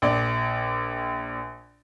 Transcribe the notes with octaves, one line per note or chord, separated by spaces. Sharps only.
A#1 D5